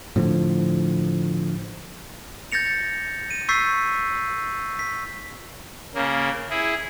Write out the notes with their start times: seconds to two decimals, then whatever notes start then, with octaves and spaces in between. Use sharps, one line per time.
0.16 A2 D3 F3
2.52 G6 A6 A#6 C#7 F7
3.31 D#7
3.49 C#6 E6 G6 A6 B6 C7
4.79 B6
5.95 C#3 A#3
6.50 E4 G#4